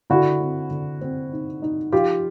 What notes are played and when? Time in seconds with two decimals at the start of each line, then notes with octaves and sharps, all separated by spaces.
0.10 D3 E4 F#4
0.40 C4
0.71 D3
1.01 C4
1.32 D#4
1.62 D#4
1.92 F3 F4 G4